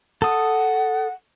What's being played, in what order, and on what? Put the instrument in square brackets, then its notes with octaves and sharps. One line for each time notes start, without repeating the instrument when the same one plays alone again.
[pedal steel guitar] A4 D#6 [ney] F#5